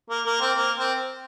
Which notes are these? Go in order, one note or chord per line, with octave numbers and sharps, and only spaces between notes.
A#3
A#3
C4
A#3
C4